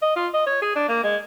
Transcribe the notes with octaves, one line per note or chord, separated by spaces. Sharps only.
D#5
F4
D#5
C#5
G#4
D4
A#3
G#3